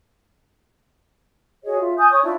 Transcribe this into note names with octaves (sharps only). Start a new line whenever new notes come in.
F#4 G#4 C#5 D#5
F4 E5
G#5 D#6 G6
C#5 C#6 D#6
D4 E4 F4